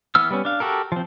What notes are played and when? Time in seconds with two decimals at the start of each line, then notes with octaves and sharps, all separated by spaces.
0.15 E3 B3 E6 F6
0.31 G3 B3 C#4
0.45 D4 F5
0.60 F#4 G4 A4 A#4
0.92 F3 C4